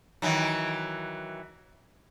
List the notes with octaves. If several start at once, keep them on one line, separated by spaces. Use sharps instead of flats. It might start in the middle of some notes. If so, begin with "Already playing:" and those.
D#3 E3 F#3